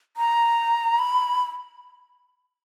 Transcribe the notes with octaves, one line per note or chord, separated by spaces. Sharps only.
A#5
B5